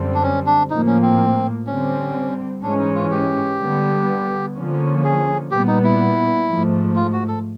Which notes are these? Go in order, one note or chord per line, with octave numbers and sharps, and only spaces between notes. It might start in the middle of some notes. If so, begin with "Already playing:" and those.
Already playing: F#2 D3 G3 C4
D4
C#4
D4
A2 F3 A#3 D#4
C#4
C4
D3 G3 C4 C#4
G#2 E3 G#3 C#4 D4
D#4
F4
G4
D3 G3 B3
D3 F3 A#3 C#4
G#4
A#2 G3 B3 G4
D#4
E4
G#2 F3 A3
F4
F#4
A4